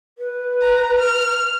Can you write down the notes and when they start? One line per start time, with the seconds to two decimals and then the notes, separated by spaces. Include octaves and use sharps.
0.18 B4
0.61 A#5
0.99 F6